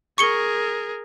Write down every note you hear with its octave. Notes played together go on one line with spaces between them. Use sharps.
G#4 A#4 C#6 C#7 G7